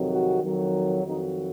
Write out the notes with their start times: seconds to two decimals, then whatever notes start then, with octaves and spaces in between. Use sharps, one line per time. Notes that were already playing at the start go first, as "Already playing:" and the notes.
Already playing: F2 C3 D#3 F#3
0.11 F#4
0.43 F2 D#3 F#3
1.06 F2 D#3 F#3 D#4